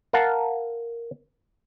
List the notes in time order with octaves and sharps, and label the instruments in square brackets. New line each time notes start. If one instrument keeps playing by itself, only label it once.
[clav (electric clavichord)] A#4 F5 F#5 A5